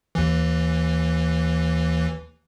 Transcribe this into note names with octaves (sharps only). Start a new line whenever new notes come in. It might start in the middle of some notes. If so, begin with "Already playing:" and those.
D#2 E3